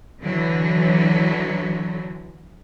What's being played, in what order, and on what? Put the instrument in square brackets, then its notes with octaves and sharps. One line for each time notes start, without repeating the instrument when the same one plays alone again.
[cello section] D3 E3 F#3